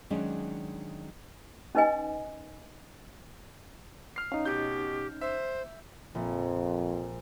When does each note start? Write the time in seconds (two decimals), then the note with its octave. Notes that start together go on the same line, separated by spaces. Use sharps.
0.10 D#3 F#3 G#3 C#4 D4
1.75 C#4 D#4 B4 D#5 G#5
4.16 F6 C7
4.32 C#4 D#4 F5
4.45 B2 G4 G6
5.21 C5 E5
6.15 A#1 F2